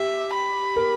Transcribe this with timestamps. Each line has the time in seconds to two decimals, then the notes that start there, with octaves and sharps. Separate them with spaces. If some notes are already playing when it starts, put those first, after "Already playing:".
Already playing: G4 E5
0.33 B5
0.76 A#4